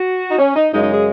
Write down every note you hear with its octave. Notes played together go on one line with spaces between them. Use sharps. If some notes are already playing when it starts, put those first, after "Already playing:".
Already playing: F#4
D#4
C#4
D#4
F#2 C#3 G#3 D#4
D#4
G#4